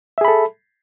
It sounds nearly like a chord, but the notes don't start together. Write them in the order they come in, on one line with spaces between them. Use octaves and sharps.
E5 G#4 B5 A4